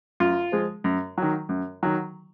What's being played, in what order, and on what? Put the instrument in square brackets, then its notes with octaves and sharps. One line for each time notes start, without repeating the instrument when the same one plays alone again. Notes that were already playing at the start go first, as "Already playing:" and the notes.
[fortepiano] F#2 F4
F3 G#3
F#2
D#3 F#3
F#2
D#3 F#3